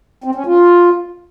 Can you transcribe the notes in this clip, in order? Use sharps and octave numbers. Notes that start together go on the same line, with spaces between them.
C4
C#4
F4